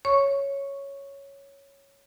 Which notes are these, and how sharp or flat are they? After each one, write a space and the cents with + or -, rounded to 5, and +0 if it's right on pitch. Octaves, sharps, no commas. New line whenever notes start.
C#5 +0 C#6 +0